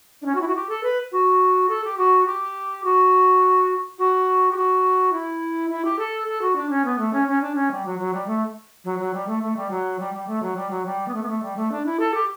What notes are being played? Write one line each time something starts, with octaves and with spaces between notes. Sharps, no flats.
D4
C#4
F#4
E4
F#4
G4
A4
B4
F#4
A4
G4
F#4
G4
F#4
F#4
G4
F#4
E4
E4
G4
A4
A4
F#4
D4
C#4
B3
A3
C#4
C#4
D4
C#4
G3
F#3
F#3
G3
A3
F#3
F#3
G3
A3
A3
G3
F#3
G3
G3
A3
F#3
G3
F#3
G3
B3
A3
B3
A3
G3
A3
D4
E4
A4
G4